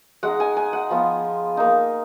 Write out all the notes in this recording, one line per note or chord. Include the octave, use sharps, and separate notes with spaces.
G#3 D#4 F#5
G#5
G#5
F#5
F3 B3 F4
A#3 D#4